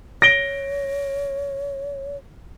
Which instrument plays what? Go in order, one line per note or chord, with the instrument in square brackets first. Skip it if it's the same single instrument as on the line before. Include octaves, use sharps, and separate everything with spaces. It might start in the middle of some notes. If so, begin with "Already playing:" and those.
[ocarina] C#5 [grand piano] A#6 D7 G7